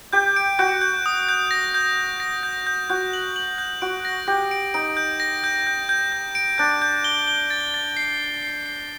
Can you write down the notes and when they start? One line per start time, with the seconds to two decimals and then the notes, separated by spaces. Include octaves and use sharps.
0.13 G4 G6
0.36 D7
0.59 F#4 G6
0.81 G6
1.06 D#6
1.29 G6
1.51 A#6
1.74 G6
1.97 G6
2.20 A#6
2.43 G6
2.67 G6
2.90 F#4 G6
3.13 F#7
3.36 F#7
3.58 G6
3.82 F#4 D7
4.05 A#6
4.27 G4 A#6
4.51 D7
4.74 D#4 D7
4.97 G6
5.20 A#6
5.44 G6
5.67 G6
5.89 G6
6.12 G6
6.35 D7
6.58 D4 G6
6.82 G6
7.04 G7
7.28 G7
7.50 A6
7.74 A6
7.97 C7
8.21 C7
8.43 C7
8.66 C7